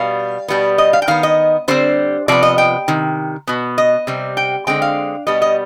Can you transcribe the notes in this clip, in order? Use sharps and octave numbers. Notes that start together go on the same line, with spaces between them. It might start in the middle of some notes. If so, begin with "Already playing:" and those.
Already playing: B2 G3 B3 F5
B2 G3 B3
D#5
F5
G5
D#3 B3 F5
D#5
D3 G3 C4 C5
C3 F3 B3 D5
D#5
G5
C3 D#3
B2 B3
D#5
C3 G3 C4
G5
D3 G#3 C4 G5
F5
B2 G3 B3 D#5
D#5